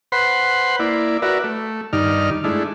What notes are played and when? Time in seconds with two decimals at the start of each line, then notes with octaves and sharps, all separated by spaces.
0.12 B4 C5 F#5 B5 C6
0.79 A#3 E4 D5
1.22 F#4 A#4 B4 D5 E5
1.44 A3
1.93 G2 D#3 D#4 D5 F6
2.44 G#3 A3 D4 E4